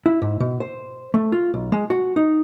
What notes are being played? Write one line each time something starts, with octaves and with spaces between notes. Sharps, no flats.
E4
G#2
B2
C5
A3
F4
B1
G#3
F#4
D#4